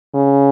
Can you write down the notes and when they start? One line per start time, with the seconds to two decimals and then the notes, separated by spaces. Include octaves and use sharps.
0.14 C#3